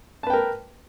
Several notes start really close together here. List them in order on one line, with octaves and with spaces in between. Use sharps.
A5 B4 G5 A#4